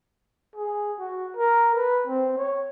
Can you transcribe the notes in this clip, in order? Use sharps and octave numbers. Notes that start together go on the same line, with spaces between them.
G#4
F#4
A#4
B4
C4
C#5